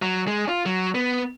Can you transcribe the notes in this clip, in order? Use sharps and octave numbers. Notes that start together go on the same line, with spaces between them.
F#3
G#3
F4
F#3
B3